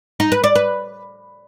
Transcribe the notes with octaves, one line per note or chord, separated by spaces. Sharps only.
D#4
B4
D5
B4